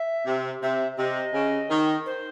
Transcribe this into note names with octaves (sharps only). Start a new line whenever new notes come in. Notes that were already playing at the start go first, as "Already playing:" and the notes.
Already playing: E5
C3
C3 E5
C3 D#5
C#3
D#3
C5